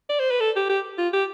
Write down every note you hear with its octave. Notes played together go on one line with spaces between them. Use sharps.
D5
C5
B4
A4
G4
G4
F4
G4